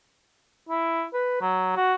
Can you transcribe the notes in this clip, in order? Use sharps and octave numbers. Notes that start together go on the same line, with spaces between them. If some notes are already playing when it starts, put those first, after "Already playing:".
E4
B4
F#3
F#4